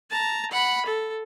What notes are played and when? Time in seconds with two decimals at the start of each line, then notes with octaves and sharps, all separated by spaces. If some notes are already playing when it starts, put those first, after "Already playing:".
0.10 A5 A#5
0.51 F#5 B5
0.85 A4